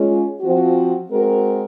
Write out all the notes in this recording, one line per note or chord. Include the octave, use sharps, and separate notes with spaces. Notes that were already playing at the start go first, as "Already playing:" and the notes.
Already playing: G#3 C#4 F4
F3 C4 F#4
G#3 C4 F#4 A#4